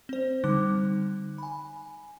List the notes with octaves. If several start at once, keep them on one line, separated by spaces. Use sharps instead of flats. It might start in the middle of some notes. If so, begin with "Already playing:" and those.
C4 C5
D3 G3 D#4 D6 F#6
G#5 B5